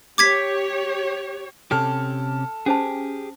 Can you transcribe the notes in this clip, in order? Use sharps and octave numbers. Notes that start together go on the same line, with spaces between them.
G4 C#5 D6 G#6 B6
C3 C#4 G4 A4 F6
C#4 G4 G#4 C5 A5